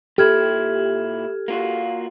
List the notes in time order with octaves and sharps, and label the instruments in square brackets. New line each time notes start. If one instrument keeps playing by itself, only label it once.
[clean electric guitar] A#2 E4 [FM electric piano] G4 [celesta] A4 F6 G#6
[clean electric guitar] A#3 F4 F#4